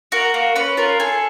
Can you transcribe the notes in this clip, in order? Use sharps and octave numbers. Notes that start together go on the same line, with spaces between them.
F#4 A#4
A#3
C#4 B4
F4 A#4
G#4 A4